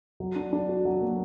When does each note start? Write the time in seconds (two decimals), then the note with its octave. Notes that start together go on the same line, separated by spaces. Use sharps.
0.20 F#3
0.36 D4
0.53 D4
0.69 F#4
0.85 F#3
1.02 A#3